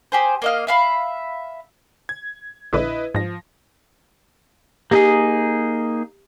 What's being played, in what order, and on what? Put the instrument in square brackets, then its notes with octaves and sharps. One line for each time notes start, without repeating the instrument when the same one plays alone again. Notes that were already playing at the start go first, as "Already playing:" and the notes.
[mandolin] G4 G#4 C5
A#3 D#5 F5
E5 F5 B5
[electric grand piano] G#6
[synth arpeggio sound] A#1 D3 [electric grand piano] E4 B4 D#5
[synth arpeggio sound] G#2 [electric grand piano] F3 A#6
[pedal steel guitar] A#3 D#4 G#4 [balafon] G4